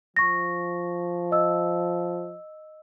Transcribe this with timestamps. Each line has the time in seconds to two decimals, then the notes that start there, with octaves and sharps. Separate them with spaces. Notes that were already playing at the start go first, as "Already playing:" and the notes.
0.17 F3 C#6 A#6
1.32 D#5 E6